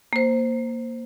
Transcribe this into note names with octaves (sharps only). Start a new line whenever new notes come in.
A#3 C5